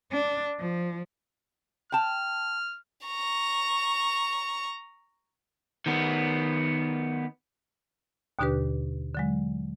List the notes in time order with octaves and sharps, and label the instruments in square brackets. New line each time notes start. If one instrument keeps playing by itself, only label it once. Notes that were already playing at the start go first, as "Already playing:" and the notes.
[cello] D4
F3
[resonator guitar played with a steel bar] G5 A5 [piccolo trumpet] F6
[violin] A#5 C#6
[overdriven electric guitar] D#3 B3
[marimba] D#2 B2 D3 D4 G4 B4
D3 F#3 G#3